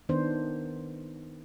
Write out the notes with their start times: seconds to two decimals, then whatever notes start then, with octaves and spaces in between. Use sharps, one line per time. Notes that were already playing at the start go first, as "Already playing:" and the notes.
0.09 D#3 B3 D4 C5